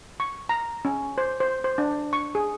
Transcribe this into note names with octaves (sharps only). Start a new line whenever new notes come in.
C#6
A#5
C#4
C5
C5
C5
D4
C#6
G#4